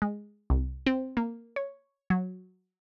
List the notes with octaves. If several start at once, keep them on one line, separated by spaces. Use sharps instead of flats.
G#3
C2
C4
A#3
C#5
F#3